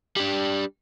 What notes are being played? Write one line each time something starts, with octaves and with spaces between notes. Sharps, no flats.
G3 D4